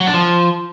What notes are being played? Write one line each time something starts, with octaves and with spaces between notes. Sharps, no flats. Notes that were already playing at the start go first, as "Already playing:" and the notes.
F#3
D4
F3